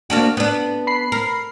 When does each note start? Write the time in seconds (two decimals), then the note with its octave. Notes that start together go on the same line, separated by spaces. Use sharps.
0.10 A#3 D4 F#4
0.37 B3 D4
0.87 B5 C7
1.12 A#4